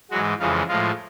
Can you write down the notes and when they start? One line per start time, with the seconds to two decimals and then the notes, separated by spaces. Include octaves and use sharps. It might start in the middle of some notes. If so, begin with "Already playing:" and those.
0.11 G#2 E3 F#3 G#3 F#4
0.39 F2 C#3 E3 G#3 F4
0.68 A2 F3 G#3 F4